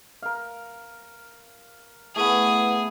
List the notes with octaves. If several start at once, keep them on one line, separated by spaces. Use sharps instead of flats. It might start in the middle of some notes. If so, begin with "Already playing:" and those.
A#4 F5
A3 B3 E4 G#4 B4 F#5